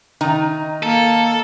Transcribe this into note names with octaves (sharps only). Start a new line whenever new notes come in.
D#3 D#4 A#5
A#3 A4